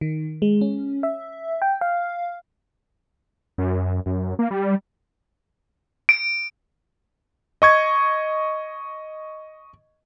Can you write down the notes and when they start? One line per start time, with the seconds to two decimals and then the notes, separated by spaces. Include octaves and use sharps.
0.01 D#3
0.42 G#3
0.61 C#4
1.03 E5
1.62 G5
1.81 F5
3.58 F#2
4.06 F#2
4.39 A#3
4.51 G3
6.09 D7
7.62 D#5 C#6 G#6